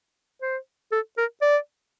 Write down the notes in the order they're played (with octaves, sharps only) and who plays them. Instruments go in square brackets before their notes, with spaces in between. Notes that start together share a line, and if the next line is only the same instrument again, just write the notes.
[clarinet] C5
A4
A#4
D5